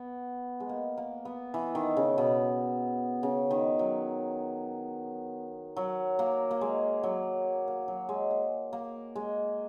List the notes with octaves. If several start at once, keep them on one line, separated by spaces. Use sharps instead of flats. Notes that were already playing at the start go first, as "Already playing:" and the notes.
Already playing: B3
G#3
A#3
A#3
B3
E3
D#3
C#3
B2
C#3
D#3
F#3
F#3
A#3
A#3
G#3
F#3
A#3
F#3
G#3
A#3
A#3
G#3